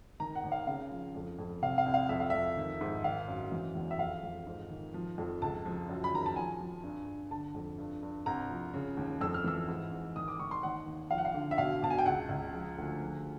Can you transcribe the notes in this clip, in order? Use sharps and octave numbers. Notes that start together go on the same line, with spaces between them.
D#3 A#5
F#5
D#2
F5
C#3 F5
F3
F2
F2
C3 F5
F5
C2
F5
F2 E5
F5
F2 E5
D#3
G#2
D#3 F5
F#2
E3
E2
E5
F2 F5
F2
G#2
D#3
F3
F2
C#2 A5
F3
F#2
B5
D#3 A#5
A5
F3 G#5
F3
G2
G2
D3 A5
F2
G2
G2
C2 A#5
F3
C#3
D#2
F2 E6
F6
E3 E6
G#2
G#2
D#3 D#6
D6
D#3 C#6
C6
D#2 F#5
D#2
F3 F5
F#5
F5
D3
E5
B2 F5
B2 A5
G#5
G5
C#2 F#5
C#2
F3
D2
F3